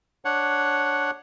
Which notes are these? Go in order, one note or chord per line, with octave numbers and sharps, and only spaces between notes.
D4 C#5 F#5